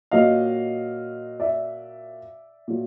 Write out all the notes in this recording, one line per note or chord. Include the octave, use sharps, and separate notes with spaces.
A#2 F#3 A#3 D#5 F5
D5 E5
A#2 F#3